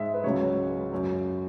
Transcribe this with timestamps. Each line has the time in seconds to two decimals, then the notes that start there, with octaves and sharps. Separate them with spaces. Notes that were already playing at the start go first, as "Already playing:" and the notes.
Already playing: G#2 G#3 E5
0.14 B4
0.24 C#2 C#3 F#3 C#5
0.92 F#2 F#3